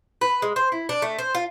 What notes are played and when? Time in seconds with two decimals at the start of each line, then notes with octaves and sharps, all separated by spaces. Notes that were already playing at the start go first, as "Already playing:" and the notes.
0.21 B4
0.42 G#3
0.56 C5
0.72 E4
0.89 D4
1.02 A3
1.19 C5
1.35 F4